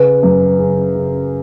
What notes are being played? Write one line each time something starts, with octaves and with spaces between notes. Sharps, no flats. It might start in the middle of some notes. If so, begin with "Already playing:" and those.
Already playing: C#3 B4
F#2
C#3
C#3